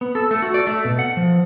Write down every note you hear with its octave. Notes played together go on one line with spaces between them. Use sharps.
B3
A4
A3
F#4
D5
A3
B2
F#5
F3